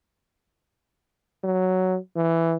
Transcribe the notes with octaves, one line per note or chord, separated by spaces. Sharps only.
F#3
E3